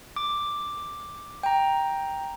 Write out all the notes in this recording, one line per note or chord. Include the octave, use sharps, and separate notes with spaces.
D6
G5 A#5